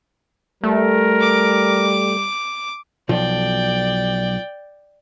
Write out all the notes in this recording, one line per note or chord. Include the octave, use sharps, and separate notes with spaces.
G3 A3 A#4
D6
B1 F3 D5 G5